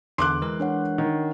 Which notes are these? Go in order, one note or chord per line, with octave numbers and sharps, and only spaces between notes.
E2 D3 C6 D6 F#6
E3 G#3 A#4
D4 C#5 F#5
D#3